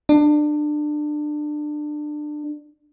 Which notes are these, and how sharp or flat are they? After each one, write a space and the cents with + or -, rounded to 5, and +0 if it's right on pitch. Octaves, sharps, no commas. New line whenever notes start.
D4 +25